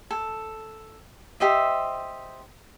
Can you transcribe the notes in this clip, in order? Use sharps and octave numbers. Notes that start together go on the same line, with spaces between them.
A4
G4 C5 D#5 E5